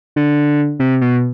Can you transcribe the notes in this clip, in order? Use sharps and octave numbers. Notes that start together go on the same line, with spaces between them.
D3
C3
B2